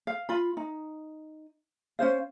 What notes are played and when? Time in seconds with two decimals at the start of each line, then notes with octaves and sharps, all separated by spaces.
0.07 F5
0.29 F4 B5
0.57 D#4
1.99 C#4 G#4 C5 F5